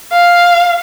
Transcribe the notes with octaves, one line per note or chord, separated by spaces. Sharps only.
F5